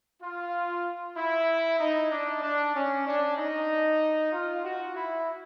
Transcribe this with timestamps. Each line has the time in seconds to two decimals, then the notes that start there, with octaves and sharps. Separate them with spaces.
0.21 F4
1.16 E4
1.79 D#4
2.11 D4
2.42 D4
2.74 C#4
3.05 D4
3.36 D#4
4.32 F4
4.64 F#4
4.94 E4